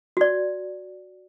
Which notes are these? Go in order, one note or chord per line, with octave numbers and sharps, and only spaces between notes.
F#4 D5